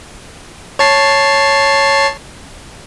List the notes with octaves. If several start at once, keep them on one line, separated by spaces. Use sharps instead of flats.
C#5 A5 C7